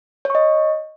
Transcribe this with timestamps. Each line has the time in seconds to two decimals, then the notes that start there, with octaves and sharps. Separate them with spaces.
0.25 C#5
0.30 C#6
0.35 D#5